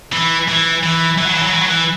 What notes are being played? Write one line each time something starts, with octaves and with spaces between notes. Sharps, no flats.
E3
E3
E3
E3
F#3
E3
F#3
E3
F#3
E3